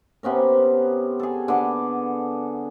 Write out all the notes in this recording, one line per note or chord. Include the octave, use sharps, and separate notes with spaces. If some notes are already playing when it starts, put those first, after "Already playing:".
C3 B3 C#4 A#4
G#4 A4
D3 B3